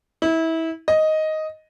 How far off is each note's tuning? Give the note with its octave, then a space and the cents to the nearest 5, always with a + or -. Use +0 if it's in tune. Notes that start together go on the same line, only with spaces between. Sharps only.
E4 -25
D#5 +5